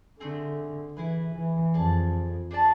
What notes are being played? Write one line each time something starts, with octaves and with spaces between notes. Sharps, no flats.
D3 A3 C4 G#4
E3 E4 G#4 B4
E3
F2 G#4 D5 A5
D4 G#4 D5 A5